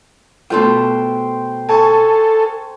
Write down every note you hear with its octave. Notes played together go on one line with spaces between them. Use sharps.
B2 A3 F4 C5 G5
A4 G#5 A5 C#6